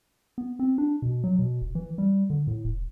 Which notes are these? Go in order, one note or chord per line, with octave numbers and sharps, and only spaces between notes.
B3
C4
D4
B2
F#3
B2
F1
E3
G3
D3
A2
E1